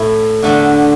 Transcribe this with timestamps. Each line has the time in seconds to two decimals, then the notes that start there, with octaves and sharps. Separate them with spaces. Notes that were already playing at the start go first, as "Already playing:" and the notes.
Already playing: A2 A3 E4
0.42 E2 D3 A3 D4